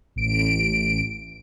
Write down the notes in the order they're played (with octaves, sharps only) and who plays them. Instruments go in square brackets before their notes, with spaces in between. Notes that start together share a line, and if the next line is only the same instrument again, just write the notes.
[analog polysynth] A1 D7